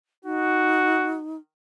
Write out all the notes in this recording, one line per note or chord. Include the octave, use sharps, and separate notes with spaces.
D#4 F#4